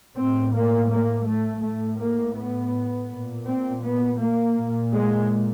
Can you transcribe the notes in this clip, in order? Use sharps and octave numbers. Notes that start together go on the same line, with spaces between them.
A2 C4
A#3
A#3
A3
A2 A3
A#3
B3
A#2
C4
B3
A#3
A#2
G#3